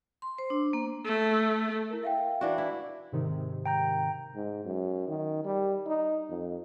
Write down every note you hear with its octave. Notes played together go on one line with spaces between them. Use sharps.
C6
C5
D4
A#3
A3
E4 A#4
E5 F5 G5
E3 D4 F#4
E4
G#2 C3 D#3
G5 A#5 G6
G#2
F#2
D#3
G3
D#4
F2